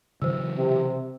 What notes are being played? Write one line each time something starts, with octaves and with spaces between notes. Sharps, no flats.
C#3 E3 F#3 C5 E6
C3